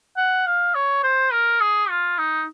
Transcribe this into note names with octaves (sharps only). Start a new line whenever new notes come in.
F#5
F5
C#5
C5
A#4
G#4
F4
D#4